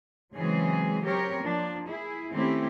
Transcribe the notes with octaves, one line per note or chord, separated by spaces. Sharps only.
C#3 E3 F#3 G#3 C4 G#4
F#3 C4 G4 A#4 C#5
F3 A#3 D4
E4 G#4
D#3 A3 C4 C#4 E4 G4